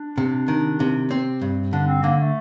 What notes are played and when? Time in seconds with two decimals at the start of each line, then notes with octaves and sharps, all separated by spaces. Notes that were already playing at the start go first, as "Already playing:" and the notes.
Already playing: D4
0.18 C3
0.48 D#3
0.80 C3
1.11 C4
1.41 G2
1.73 D3 D4
1.87 C4
2.03 D3 A#3
2.19 A3